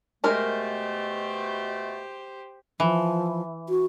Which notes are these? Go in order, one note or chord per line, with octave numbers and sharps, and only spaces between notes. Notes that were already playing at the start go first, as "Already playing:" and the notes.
B2 G#3 A3 G4 A#4 C5 A#5
E3 F3
F#4